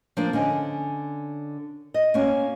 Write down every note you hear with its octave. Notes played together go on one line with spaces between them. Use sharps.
F3 A#3 D4
D3 C#4 D#5 G#5
D#5
A#3 C#4 F#4